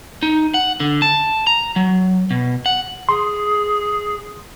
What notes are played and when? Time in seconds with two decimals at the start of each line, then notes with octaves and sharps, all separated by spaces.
0.23 D#4
0.54 F#5
0.80 D3
1.02 A5
1.47 A#5
1.76 F#3
2.31 B2
2.66 F#5
3.09 G#4 C6